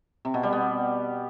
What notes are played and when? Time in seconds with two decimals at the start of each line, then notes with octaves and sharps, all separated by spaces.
0.25 C3
0.34 B2
0.43 G3
0.53 B3